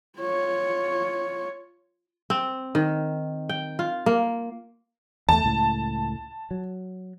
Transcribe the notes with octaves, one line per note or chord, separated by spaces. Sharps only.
F4 C#5
C4
D#3
G5
F4
A#3
E2 A3 A5
C#2 A2
F#3